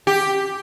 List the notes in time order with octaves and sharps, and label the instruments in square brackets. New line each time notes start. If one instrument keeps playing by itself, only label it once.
[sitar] G4